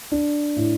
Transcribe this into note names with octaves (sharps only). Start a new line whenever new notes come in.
D4
A2